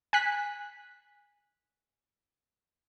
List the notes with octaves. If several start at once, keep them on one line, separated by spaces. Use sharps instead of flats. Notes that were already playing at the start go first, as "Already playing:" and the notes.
G#5 F#6 B6